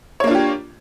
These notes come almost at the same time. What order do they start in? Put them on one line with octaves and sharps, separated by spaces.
C#5 A#3 D4 F4 G4